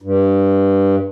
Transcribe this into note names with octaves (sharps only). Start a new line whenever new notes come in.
G2